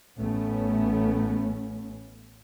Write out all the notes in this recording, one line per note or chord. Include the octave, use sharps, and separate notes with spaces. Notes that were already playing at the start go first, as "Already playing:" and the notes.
A1 A3 B3 C#4